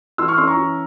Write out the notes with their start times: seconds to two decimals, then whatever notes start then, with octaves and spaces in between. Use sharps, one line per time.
0.18 E3 C6 E6
0.28 C#6 F6
0.38 C#4 C6 E6
0.47 A#5 C#6
0.57 E3